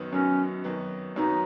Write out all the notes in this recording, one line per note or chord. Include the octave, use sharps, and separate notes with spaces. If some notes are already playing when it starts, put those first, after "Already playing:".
Already playing: F#2 D#3 F#3 B3
F#2 D#3 F#3 B3 C#4
F#2 D#3 F#3 B3
F#2 D#3 F#3 B3 D#4